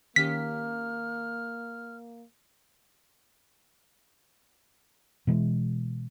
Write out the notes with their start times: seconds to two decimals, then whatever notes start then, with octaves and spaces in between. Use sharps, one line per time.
0.16 D#3 A#3 C#4 G4 F6 B6
5.27 B2 E3 G#3